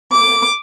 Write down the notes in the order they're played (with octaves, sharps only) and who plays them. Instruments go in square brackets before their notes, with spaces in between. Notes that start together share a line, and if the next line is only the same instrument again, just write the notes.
[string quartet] D6